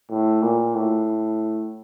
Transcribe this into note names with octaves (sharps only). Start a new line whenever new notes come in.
A2
A#2
A2